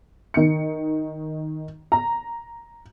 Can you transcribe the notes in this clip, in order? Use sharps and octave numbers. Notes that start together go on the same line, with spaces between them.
D#3 C#7
A#5